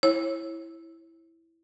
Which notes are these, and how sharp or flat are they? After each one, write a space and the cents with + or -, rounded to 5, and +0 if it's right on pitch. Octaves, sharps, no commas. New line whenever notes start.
E4 +0 C#5 -30